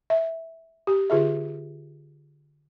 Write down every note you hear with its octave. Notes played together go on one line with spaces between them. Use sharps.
E5
G4
D3 F4 G#4 E5